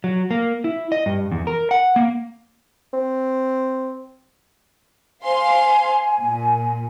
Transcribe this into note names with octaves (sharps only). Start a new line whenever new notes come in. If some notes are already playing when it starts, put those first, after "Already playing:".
F#3
A#3
E4
D#5
G2
E2
A#4
F#5
A#3
C4
C5 F5 G#5 C6
A#2